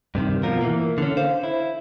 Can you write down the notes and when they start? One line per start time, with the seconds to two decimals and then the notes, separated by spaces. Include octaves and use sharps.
0.15 G2 C3 D#3
0.43 B2 F3 F4 A#4
0.61 E3 A#3
0.98 D3 C#4
1.17 C5 F5
1.43 E4